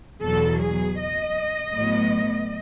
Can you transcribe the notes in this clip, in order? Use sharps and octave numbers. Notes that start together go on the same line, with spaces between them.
E2 B2 F#3 A4
G#4
D#5
A2 F#3 B3